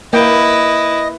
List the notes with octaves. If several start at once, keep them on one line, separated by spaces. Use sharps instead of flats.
A#3 E4 B4 D#5 G5